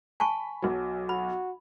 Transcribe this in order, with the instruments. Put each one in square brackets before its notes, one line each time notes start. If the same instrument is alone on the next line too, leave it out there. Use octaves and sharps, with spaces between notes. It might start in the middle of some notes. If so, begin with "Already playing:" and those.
[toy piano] G#5 A5 C#6 [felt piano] B5
[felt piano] B1 F#3
[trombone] F#4 [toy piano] B5